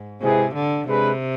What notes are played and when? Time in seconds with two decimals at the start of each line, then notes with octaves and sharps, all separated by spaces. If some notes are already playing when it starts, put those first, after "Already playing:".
Already playing: G#2
0.21 C3 G#3 C4 E4 G#4 B4
0.55 D3
0.87 C3 G#3 D4 G#4 B4